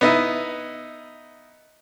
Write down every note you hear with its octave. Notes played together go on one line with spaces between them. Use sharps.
B3 D#4 E4